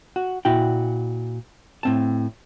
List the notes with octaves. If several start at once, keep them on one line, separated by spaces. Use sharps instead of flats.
F#4
A#2 E4 F#4 G5
A2 C4 A5